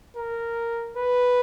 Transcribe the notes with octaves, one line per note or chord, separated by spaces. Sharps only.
A#4
B4